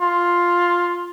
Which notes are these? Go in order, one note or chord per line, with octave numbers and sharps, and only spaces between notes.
F4